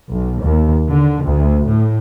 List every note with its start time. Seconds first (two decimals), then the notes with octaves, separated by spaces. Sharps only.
0.11 B1
0.42 D#2
0.91 D3
1.25 D2
1.68 A2